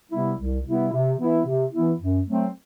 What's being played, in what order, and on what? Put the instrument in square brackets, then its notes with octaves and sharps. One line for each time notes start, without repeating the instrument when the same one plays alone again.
[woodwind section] C3 G3 B3 E4
C2
C3 G3 B3 E4
C3
E3 B3 E4
C3
E3 B3 E4
F#2
F#3 A3 C4